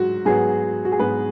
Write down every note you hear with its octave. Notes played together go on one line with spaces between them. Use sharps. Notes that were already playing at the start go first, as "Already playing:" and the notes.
Already playing: G#2 F#3 F#4
G#2 F#3 B3 G#4
F#4
G#4
G#2 F#3 B3 B4